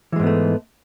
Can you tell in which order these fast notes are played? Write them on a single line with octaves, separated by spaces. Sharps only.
E3 G#3 G#2 B3 A3